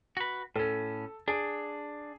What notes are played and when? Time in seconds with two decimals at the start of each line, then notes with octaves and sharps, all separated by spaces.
0.17 F#4 B4
0.56 A2 C#4 A4
1.28 D4 G#4